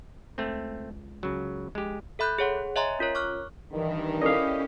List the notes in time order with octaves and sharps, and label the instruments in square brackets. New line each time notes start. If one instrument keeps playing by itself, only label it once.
[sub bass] C#2 [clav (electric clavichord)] A3 C4
[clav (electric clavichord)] C#3 F#3
[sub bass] A#1 [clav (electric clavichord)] G#3 G4
[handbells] A4 E5 B5 F#6 G6
G#4 C#5 F#5 C6
C#5 D#5 E5 G#5 A#5 C6
C#4 F4 A#4 C#5
C#6 D6 F6 F#6
[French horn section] G2 D#3 [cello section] E3
[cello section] C#4 E4 G4 [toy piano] A4 A#4 D5 [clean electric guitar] D#5 F5